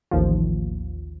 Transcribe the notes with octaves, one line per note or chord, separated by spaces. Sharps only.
A1 D#2 F3